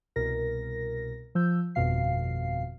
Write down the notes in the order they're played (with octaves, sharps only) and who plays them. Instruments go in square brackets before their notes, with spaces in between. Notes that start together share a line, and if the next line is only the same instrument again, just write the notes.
[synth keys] C2 B2 A#4 A#6
F3 E6 G6
G1 F2 B2 F5 C7